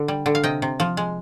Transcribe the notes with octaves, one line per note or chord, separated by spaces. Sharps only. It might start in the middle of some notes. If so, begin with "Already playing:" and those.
Already playing: D3
G3
D3
F5
C3 D#5 G5
C3
F3
G#3